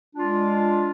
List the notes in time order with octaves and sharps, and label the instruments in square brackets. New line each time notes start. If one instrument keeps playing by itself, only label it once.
[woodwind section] G#3 D4 F4